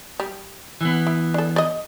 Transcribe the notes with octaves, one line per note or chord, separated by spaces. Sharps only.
G3
E3 B3
E4
D4 A4
D5 D#5